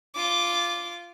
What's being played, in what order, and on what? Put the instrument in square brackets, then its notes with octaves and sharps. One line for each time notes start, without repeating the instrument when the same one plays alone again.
[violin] F4 D6